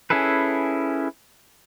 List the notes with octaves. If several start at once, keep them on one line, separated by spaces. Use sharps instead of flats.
C#4 E4 G#4 A4 B4